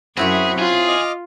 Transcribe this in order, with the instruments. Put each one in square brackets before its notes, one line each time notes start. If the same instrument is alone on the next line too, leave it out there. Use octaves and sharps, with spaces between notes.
[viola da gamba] F#2 [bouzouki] C4 E4 C#5 [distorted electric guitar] G#4 [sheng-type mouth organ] F#5 B5
[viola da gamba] F4 [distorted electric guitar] G#4
[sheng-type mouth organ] D#5 D6 F6